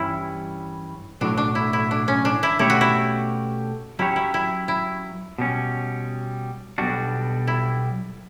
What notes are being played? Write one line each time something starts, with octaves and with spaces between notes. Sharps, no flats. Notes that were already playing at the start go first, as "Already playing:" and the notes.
Already playing: G2 E3 G3 C#4 E4
B1 A2 F#3 D4
D4
E4
E4
D4
C#4
D4
E4
B2 A3 C#4 E4 G4 C#5
F#4
E4
F#3 C#4 E4 G4 C#5
E4
E4
E4
B2 G3 C#4
B1 B2 G3 D4 F#4
E4